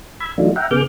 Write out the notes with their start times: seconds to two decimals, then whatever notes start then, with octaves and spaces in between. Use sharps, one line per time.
0.20 B5 E6 G#6
0.38 E3 F#3 A3 D4 D#4 F4
0.56 E5 F#5 G5 A#5
0.71 C#3 B3 G#4 D6 F6 G6